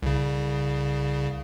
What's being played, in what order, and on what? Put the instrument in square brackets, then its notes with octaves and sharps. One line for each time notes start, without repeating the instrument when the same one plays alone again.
[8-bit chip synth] C2 C#3